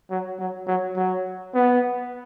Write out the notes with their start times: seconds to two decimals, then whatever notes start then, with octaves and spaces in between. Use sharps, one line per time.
0.10 F#3
0.39 F#3
0.67 F#3
0.96 F#3
1.54 B3